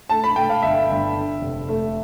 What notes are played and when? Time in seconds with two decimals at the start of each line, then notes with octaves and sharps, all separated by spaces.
0.10 A3 A5
0.24 B5
0.36 A3 G5
0.50 F5
0.62 G1 E5
0.90 G1
1.16 D3
1.42 F1
1.68 A3